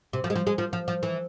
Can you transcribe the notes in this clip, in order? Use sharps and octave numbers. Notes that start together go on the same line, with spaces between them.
C3
F3
G#3
F3
G#3
F3
F3
F3
E3